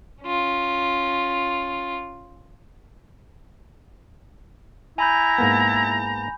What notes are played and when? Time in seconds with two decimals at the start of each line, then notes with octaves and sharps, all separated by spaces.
0.24 C#4 F4
4.98 E4 G#5 A#5 B5 G6
5.38 G#2 A#3 B3